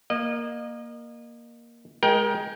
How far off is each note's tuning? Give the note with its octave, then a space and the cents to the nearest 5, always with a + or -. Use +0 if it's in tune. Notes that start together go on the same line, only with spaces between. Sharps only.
A#3 +10 D#5 -30
G#3 +0 A#4 +30 G5 +0